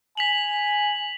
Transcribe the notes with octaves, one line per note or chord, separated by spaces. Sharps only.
G#5 B6 F7 F#7